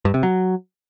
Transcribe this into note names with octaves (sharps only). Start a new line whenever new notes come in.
G2
C3
F#3